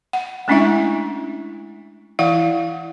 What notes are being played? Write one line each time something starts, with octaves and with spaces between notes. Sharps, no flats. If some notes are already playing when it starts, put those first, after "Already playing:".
F#5
G#3 A3 C#4 D4 E4 E5
E3 E4 F5 F#5